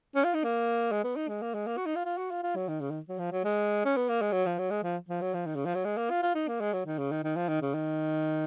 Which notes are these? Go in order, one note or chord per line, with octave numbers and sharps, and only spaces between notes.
C#4
F4
D#4
A#3
G#3
B3
D#4
G#3
A#3
G#3
A#3
F#4
D#4
F4
F4
F#4
F4
F4
F#3
D#3
C#3
D#3
F#3
F3
F#3
G#3
C#4
B3
A#3
G#3
F#3
F3
F#3
G#3
F3
F3
F#3
F3
D#3
C#3
F3
F#3
G#3
A#3
F4
F4
D#4
A#3
G#3
F#3
D#3
C#3
D#3
D#3
F3
D#3
C#3
D#3